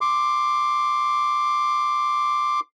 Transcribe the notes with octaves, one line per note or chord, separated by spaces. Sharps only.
C6 D6